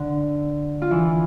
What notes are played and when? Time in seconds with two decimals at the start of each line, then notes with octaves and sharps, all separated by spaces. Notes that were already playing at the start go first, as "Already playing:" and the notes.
Already playing: D3 D4
0.82 F4
0.90 E3 E4